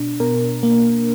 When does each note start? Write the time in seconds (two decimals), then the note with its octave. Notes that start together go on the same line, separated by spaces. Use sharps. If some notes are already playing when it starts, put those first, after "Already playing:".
Already playing: B2 D4
0.20 B2 A#4
0.63 A#3